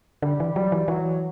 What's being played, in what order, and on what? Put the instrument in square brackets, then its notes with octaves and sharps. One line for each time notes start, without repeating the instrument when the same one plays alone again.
[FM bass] D3 [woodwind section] G3
[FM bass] E3
[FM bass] F#3 [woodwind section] G3
[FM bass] E3
[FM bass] E3 [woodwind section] F#3